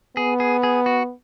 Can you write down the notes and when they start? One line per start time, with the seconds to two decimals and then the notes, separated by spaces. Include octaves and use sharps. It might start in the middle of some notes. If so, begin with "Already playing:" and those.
0.16 B3 G#4
0.40 G#4
0.63 G#4
0.86 F#4